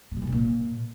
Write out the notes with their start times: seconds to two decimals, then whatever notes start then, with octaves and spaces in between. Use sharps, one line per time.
0.11 C#3
0.17 B2
0.22 E3
0.27 D3
0.32 A#2